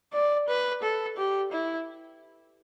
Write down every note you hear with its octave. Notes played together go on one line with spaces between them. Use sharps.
D5
B4
A4
G4
E4